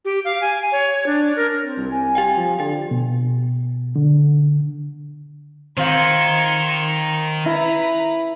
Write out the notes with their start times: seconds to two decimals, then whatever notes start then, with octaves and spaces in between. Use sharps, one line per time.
0.05 G4
0.25 F5
0.41 G#5
0.72 C#5
1.06 D4
1.36 A#4
1.63 C4
1.77 C2
1.91 G#5
2.15 G4 F5 G5
2.37 F3
2.59 D3 G4 G5
2.91 B2
3.96 D3
5.77 D#3 C4 F4 G5 C6 G#6 C#7
7.46 E4 B4 A#5 B5